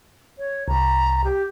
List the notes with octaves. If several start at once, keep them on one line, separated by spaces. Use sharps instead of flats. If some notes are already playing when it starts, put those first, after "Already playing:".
C#5
C2 A#5
G4